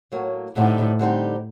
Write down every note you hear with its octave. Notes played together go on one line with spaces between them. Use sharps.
A2 F#3 A#3
A2 D3 G3 C4 D#4 G4
D3 G3 C4 D#4 G4